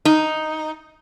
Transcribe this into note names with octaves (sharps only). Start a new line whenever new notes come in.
D#4